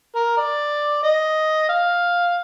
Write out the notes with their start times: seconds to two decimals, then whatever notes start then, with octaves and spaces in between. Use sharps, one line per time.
0.15 A#4
0.37 D5
1.03 D#5
1.69 F5